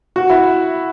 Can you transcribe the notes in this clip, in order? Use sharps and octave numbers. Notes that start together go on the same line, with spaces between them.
F#4
E4